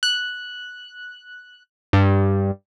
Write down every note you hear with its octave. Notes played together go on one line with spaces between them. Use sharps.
F#6
G2